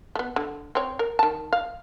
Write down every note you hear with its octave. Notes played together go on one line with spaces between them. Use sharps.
A3 B3
D3
C4 C#5
A#4
D#3 A5
F5